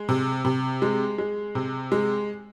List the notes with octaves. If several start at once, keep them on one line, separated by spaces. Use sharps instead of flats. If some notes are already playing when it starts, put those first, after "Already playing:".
Already playing: G#3
C3
C3
G#3
G#3
C3
G#3